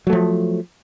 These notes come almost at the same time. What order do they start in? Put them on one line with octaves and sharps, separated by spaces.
F#3 A3 F3